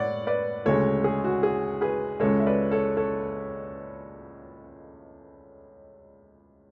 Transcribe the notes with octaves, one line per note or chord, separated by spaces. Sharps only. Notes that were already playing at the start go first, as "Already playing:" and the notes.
Already playing: A2 G#3 C#5 D5 F#5
B4 D5
D2 C#3 G#3 A4 C#5
G#4
F#4
G#4
G#4 B4
C#2 C#3 G#3 A4 C#5
E5
B4 D5
A4 C#5
A4 C#5